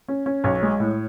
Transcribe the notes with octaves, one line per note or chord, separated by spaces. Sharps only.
C#4
C#4
B1 C#5
G#3
A2